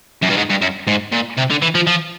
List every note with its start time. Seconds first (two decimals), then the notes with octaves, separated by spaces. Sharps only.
0.22 F#2
0.29 G2
0.36 G#2
0.50 G2
0.61 F#2
0.87 G#2
1.12 A#2
1.37 C3
1.50 D3
1.62 E3
1.75 F3
1.87 F3